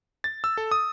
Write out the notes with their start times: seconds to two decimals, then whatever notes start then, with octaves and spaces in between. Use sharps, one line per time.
0.24 A6
0.44 E6
0.58 A4
0.71 D#6